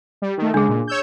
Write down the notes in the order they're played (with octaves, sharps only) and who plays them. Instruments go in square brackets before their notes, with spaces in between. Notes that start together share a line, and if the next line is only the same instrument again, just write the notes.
[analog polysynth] G3
D#3 A3
[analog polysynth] C#3 G#3 [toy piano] D4 G#4
[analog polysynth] A#2
C#5 E6 G6